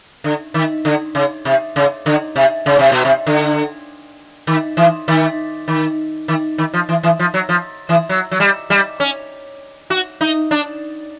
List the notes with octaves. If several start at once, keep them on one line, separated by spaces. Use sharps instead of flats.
D3
D#3
D3
C#3
C3
C#3
D3
C3
C#3
C3
B2
C3
D3
D#3
E3
D#3
D#3
D#3
D#3
F3
E3
E3
F3
F#3
F3
E3
F#3
F#3
G3
G3
C#4
F#4
D#4
D4